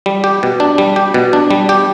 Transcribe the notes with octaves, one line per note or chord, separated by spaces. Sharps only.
G3
G4
B2
D4
G3
G4
B2
D4
G3
G4